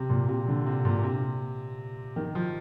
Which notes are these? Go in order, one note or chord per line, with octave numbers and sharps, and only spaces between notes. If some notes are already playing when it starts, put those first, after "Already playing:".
Already playing: C3
A#2
C3
D3
C3
A#2
C3
D#3
F3